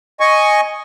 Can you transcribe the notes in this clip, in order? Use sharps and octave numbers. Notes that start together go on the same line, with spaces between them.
D#5 G#5 C#6